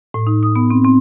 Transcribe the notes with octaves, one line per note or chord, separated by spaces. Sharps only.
A2
D#4
D#6
B3
C4
C4